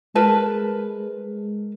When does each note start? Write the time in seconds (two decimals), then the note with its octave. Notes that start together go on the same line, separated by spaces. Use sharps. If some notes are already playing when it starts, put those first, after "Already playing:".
0.15 G#3 A#4 B4 A5